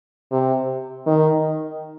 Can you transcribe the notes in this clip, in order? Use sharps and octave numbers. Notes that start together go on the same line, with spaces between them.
C3
D#3